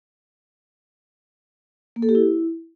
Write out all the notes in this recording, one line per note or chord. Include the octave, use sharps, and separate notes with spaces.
A#3
A4
G4
E4